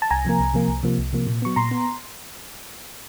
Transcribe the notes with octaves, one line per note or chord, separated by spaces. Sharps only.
A5
C2 G#5 A#5
C3 F3 A#3
C2
C3 F3 A#3
C2
C3 F3 A#3
C2
C3 F3 A#3
A#2
F#3 B3 C#6
A#2 A#5 C6
B3